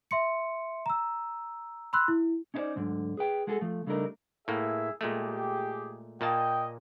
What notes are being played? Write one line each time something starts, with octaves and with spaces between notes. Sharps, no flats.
E5 C6 C#7
A#5 E6
B5 C6 E6 F#6
E4
C#4 D#4 E4 G#4 C5 D5
D2 G#2 D3 F#3
G#4 B4 G5
G#3 F#4 G#4 A4
F3 A3
C#3 G3 A3 D4 D#4 A#4
A2 A#3 G#4 E5
A#2 G#3 A3 G4 G#4
A#2 A#3 D#5 G5 A5